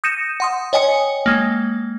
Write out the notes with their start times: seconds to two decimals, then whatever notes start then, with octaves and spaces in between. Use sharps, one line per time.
0.04 D#6 G6 A#6 C#7 D#7 E7
0.40 F#5 C6 D#6
0.73 C#5 D#5 G5 G#5 D#6 C#7
1.26 G#3 A#3